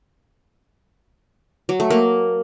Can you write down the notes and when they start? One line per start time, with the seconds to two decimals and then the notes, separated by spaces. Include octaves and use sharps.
1.69 F#3
1.80 A3
1.90 A#3